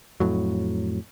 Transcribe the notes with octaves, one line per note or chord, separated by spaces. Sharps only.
F2 A2 F#3